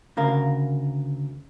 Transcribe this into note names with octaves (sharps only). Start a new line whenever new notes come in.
D2 C#3 A#4 F5